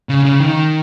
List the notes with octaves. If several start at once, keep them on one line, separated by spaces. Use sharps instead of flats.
C#3
C#3
D#3